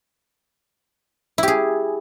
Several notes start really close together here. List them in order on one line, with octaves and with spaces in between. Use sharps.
E4 G4 G#4